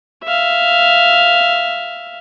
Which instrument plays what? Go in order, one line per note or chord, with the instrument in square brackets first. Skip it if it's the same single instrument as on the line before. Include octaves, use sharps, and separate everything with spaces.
[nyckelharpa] E5 F5